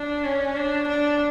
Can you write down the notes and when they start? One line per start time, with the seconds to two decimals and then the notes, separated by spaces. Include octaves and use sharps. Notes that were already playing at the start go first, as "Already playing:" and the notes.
Already playing: D4
0.25 C#4
0.56 D4
0.88 D4